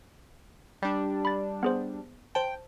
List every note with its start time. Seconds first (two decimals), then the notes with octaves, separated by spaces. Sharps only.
0.82 G3 D4
1.25 B5 A6
1.63 B3 G#4 C5
2.35 C5 G5 A5